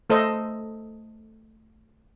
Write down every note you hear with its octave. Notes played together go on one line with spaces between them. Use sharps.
A3 A4 C5 D#5